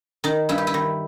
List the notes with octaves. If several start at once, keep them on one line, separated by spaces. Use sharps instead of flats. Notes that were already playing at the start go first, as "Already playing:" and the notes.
D#3 D#4
G2 E4
G4
E4
D#3